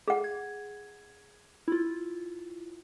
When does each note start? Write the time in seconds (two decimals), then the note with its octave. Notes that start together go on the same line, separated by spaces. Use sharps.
0.08 G#4 F#5
0.24 G#6
1.68 E4 F4